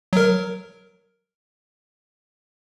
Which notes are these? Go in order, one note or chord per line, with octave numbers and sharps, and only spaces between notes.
F#3 A#4